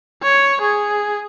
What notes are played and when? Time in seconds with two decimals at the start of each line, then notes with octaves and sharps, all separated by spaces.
0.23 C#5
0.62 G#4